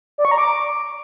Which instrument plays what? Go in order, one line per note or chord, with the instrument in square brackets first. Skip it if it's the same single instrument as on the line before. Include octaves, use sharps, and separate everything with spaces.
[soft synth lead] D5
C#6
A#5
D6